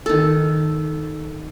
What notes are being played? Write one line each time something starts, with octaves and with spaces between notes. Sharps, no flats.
D#3 A4